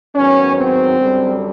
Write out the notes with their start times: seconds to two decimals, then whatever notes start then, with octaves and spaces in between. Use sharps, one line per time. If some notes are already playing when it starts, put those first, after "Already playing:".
0.14 G#2 D#3 F#3 B3 C#4
0.57 C4
0.97 F#2 D3 G3